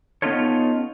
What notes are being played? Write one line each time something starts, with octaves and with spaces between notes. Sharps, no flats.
B3 C#4 D#4 F4 A4 C#5